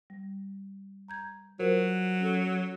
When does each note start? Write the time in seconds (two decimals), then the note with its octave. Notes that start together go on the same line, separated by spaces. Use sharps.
0.10 G3
1.08 A#5 G6 G#6
1.60 F#3 F4 A#4 C5
2.20 C#4 A4